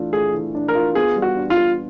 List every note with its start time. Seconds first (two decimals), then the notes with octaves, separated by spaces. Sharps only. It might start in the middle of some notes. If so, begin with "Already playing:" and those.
Already playing: E3 A3 D4 F4
0.12 A3 G#4
0.34 E3
0.55 D4
0.68 A#4
0.75 F4
0.95 B3 G#4
1.16 G3
1.22 F#4
1.37 D4
1.50 F4
1.57 G4